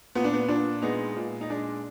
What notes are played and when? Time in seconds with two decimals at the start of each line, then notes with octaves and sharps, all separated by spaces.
0.15 A#2 B3
0.24 D4
0.33 B3
0.48 A#2 D4
0.82 G#3 B3 D#4
1.16 A#2
1.41 D#4
1.50 G#3 D4